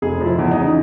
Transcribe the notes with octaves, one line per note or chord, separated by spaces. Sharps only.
F1 G#4
F3
E4
E2
D#4
C#3